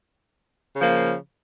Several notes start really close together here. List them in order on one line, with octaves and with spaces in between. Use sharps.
C#3 F3 A#3